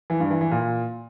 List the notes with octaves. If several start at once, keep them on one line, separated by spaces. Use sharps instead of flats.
E3
G2
E3
E3
A#2